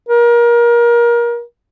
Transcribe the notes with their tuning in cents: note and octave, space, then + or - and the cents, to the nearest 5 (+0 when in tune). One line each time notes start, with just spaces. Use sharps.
A#4 +25